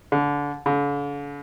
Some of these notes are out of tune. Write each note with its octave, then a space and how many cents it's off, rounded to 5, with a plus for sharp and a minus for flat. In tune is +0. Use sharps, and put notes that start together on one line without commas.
D3 -25
D3 -45